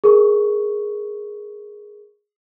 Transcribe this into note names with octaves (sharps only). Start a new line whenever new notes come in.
G#4 A#4 C#6